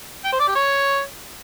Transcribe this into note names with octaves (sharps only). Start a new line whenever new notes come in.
G5
C5
D5
G4
C#5